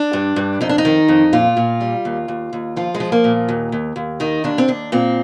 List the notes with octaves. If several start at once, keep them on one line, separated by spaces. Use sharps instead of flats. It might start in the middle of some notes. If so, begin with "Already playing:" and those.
Already playing: D4
G2
G2
F2 D#4
D4
D#4
D#3
F2
A#2 F4
A#2
G3
D#2
D#2
D#2
F3 F4
G#3
F3
A#3
A#2
D#2
D#2
D#2
D#3 D#4
D#2 D4
C4
D#2 D4
A#2 C4